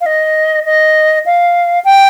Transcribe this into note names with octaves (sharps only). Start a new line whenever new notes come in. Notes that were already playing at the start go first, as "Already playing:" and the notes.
F5
D#5
D#5
F5
G5